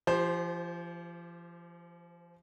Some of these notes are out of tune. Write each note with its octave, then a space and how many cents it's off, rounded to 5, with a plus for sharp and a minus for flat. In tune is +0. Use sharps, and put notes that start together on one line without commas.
F3 -35 G4 +0 C5 +0